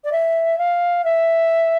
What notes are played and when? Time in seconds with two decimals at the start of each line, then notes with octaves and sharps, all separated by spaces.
0.04 D5
0.12 E5
0.58 F5
1.04 E5